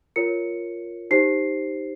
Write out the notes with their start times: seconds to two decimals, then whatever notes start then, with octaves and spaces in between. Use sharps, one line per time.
0.16 F4 A#4 C#5 C#7
1.11 D#4 G4 C5 C7